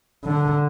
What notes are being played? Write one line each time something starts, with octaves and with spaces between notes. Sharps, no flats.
D3